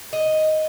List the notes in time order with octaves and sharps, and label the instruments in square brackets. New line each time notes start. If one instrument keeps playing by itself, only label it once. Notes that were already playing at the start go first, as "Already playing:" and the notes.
[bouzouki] D#5